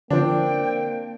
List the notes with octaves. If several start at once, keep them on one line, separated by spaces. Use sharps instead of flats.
D3 F3 A#3 C4 D4 G5